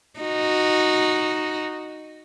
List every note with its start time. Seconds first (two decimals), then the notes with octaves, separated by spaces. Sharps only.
0.20 D#4 F#4